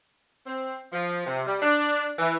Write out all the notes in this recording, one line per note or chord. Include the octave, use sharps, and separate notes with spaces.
C4
F3
C3
G3
D4
E3